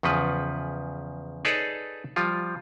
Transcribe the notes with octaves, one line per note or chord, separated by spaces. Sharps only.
E2 C#3 F3 B4
D#4 G#4 A4 B4 C#5 D5
F3 G3 F4